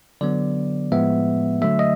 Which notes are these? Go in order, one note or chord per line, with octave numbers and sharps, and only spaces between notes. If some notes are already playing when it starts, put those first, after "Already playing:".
D3 F#3 B3 D5
A2 F3 G#3 B3 E5
D3 F#3 A3 E5
D#5